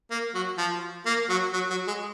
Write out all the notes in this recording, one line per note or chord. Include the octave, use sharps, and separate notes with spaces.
A#3
F#3
F3
A#3
F#3
F#3
F#3
G#3